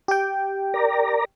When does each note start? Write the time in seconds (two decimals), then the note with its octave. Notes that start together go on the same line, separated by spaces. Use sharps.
0.08 G4 G5
0.74 A#4 D5 A#5